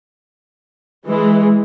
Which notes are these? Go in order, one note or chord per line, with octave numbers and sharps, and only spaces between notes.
E3 G#3